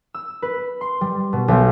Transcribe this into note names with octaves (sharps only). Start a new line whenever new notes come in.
E6
B4
C6
G3
B2
B1